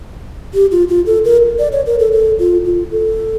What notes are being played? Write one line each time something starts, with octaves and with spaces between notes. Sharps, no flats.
G4
F4
F4
A4
A#4
D5
C#5
A#4
A4
A4
F4
F4
A4